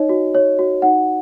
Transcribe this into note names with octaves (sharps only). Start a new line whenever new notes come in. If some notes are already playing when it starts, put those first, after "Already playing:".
Already playing: D#4 C#5 D#5
F#4
C#5
F#4
D#4 F#5